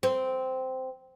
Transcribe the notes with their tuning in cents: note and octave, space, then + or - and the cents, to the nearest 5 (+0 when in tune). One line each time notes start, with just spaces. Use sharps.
C4 -10